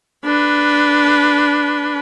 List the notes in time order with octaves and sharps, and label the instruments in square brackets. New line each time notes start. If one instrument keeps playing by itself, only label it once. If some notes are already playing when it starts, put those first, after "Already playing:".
[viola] D4 B4